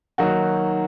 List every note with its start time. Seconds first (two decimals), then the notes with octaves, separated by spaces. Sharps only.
0.18 D#3 F#3 A#3 D#4 F#4